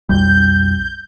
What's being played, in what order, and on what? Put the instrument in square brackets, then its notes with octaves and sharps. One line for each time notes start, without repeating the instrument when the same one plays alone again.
[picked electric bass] B1 F2 G3 [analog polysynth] G6